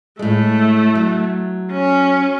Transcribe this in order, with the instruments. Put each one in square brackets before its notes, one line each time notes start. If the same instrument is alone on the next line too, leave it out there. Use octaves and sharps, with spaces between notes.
[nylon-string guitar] A2 G#3 [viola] A3
[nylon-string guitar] F#3
[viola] C#4